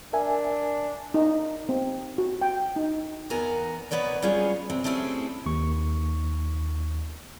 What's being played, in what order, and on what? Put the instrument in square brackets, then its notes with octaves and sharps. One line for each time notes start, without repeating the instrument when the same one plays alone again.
[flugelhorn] D4 [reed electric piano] A#4 E5 G#5
[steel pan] D#4
C4
F#4
G5
D#4
[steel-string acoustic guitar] E2 B3 A#4 G#5 A#5
B2 E3 B3 B4 C#5 D5
G3 G#3 B3 C#4 F4 G#4
C3 C4
A3 C4 C#4 E4 G4 G#4
[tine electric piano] D#2 C#6